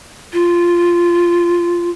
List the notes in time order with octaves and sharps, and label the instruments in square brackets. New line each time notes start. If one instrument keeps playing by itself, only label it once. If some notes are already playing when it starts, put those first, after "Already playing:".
[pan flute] F4